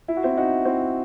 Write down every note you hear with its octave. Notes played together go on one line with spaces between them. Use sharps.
E4
F#4
C4 E4
D#4 F#4
C4 E4